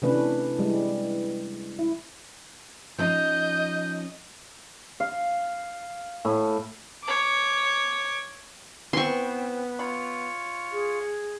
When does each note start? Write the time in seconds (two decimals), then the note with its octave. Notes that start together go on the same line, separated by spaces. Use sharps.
0.02 C3 E3 A3 C#4 D4 B4
0.58 E3 G3 G#3
1.79 E4
2.98 F3 C#4 D#4 D#5 G6
5.00 F5
6.25 A2
7.04 C#5 D6
8.93 E3 B3 C4 C6 C#6
9.79 F4 C#5 B5
10.72 G#4